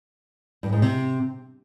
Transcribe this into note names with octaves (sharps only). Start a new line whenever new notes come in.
G2
G#2
C3